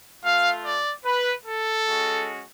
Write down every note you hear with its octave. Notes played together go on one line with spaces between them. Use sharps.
A3 F4 F5
D5
B4
A4
G#3 C#4 F#4